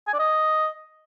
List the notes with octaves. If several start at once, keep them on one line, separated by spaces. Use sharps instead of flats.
G#5
D5
D#5